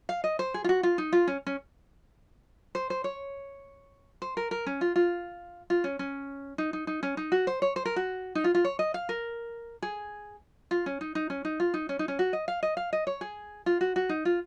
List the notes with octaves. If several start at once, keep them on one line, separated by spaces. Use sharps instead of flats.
F5
D#5
C5
G#4
F4
F#4
F4
D#4
F4
C#4
C#4
C5
C5
C#5
C5
A#4
A#4
C#4
F4
F4
F4
C#4
C#4
D#4
D#4
D#4
C#4
D#4
F#4
C5
C#5
C5
A#4
F#4
D#4
F4
F4
C#5
D#5
F5
A#4
G#4
F4
C#4
D#4
D#4
C#4
D#4
F4
D#4
C#4
D#4
C#4
F#4
D#5
F5
D#5
F5
D#5
C#5
G#4
F4
F#4
F#4
D#4
F4